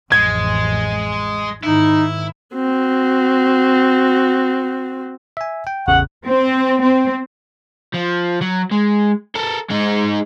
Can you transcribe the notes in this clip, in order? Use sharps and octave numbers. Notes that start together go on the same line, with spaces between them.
A1 F2 G#3 G#6
G#2 D#3 D#4 E4
C4 F#4
E5 G#5
G5
A1 E2 C#3 F#5
C4
C4
F3
F#3
G#3
A4 A#4
G#3 D#4